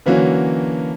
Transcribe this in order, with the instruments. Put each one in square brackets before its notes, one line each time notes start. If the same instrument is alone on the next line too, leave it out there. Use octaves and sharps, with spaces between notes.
[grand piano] D3 E3 F#3 A#3 C#4